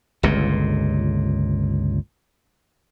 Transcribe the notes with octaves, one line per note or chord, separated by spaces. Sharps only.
G1 C#2 A#2